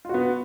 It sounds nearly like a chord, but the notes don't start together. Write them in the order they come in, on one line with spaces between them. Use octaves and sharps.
F4 F#4 B3